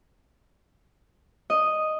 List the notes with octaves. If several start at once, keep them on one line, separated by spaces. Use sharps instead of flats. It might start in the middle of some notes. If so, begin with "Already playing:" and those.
D#5